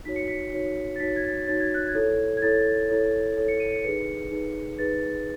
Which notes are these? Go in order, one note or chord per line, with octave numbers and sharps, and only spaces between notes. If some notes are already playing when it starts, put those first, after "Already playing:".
D#4 F#4 C#5 B6
C#7
B6
D#4 F#4 C#5
A6
D#4 F#4 C#5 B6
G#6
A6
D#4 F#4 C#5 A6
G#6
F#6
G#6
E4 A4 C#5
G#6
E4 A4 C#5 A6
E4 A4 C#5
E4 A4 C#5
C#7
D#7
C#7
D#4 G#4 B4 C#7
D#4 G#4 B4
D#4 G#4 B4 A6